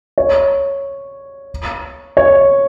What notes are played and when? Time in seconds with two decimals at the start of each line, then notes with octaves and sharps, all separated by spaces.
0.18 C#5
2.17 C#5